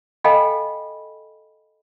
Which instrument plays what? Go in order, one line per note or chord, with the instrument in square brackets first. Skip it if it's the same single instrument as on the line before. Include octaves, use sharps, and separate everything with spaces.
[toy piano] A4 D#5 F5 G5 G#5 B5